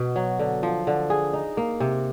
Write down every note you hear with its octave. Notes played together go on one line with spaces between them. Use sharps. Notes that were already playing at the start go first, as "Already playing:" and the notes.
Already playing: B2
F#3
D3
F3
D3
G#4
D#4
A#3
C3